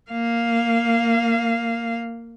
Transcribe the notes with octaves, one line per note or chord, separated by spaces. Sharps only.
A#3 F5